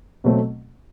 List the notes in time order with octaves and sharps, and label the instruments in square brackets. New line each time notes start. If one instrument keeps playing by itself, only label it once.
[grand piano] B2 F#3 A3 C4